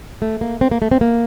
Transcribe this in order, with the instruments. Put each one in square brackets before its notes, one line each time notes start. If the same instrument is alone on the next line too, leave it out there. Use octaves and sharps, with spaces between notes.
[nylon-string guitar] A3
A#3
C4
A#3
A3
C4
A#3